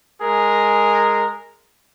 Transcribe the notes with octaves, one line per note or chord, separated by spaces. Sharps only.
G#3 G#4 A#4